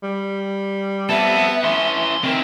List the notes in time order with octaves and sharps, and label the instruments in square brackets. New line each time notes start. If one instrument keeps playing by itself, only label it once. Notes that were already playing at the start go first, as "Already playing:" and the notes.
[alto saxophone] G3
[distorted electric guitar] B3 [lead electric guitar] C4 A4 [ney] E5
[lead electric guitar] E3 C#4 [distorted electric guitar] C6
[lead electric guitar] D#3 E4 [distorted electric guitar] C4 [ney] A#4